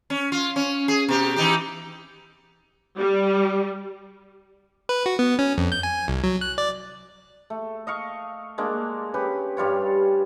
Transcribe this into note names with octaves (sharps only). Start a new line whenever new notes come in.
C#4
F4
C#4
G#4
B2 G4
E3 D#4 G4
G3
B4
F#4
B3
C#4
F2
G6
G#5
C2
F#3
F#6
D5
A3
D#5 F5 C#6
G#3 A#3 D4
C#4 G4 B4
G2 G3 F4 C#5